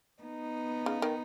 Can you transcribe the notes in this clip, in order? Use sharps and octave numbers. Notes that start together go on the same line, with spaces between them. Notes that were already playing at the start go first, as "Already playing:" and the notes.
B3 D#4
C#3
D#3